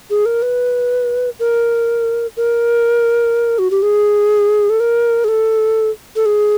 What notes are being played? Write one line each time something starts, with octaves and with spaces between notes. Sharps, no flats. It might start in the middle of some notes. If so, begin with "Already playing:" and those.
G#4
A#4
B4
A#4
A#4
F#4
G4
G#4
A4
A#4
G#4
A4
A4
G#4